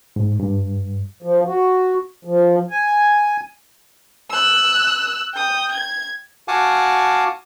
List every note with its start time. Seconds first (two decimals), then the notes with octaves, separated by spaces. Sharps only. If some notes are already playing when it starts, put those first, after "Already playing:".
0.16 G#2
0.40 G2
1.22 F3
1.47 F#4
2.25 F3
2.71 G#5
4.31 E6 F#6
5.34 G5 D#6
5.72 G#6
6.48 F#4 F5 F#5 G#5 A5 D6